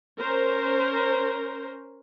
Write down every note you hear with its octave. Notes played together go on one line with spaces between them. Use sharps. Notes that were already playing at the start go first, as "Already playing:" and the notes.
C#4 A#4 C5